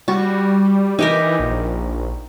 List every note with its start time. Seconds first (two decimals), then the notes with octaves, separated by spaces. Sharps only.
0.08 G3 F#4
0.99 E3 D#4 G4 A#4
1.39 A#1